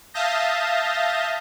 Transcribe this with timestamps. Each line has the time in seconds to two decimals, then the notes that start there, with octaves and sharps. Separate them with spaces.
0.14 E5 F5 A5 D#6 G6 A#6